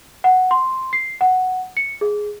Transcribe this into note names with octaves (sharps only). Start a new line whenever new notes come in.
F#5
C6
C7
F#5
C#7
G#4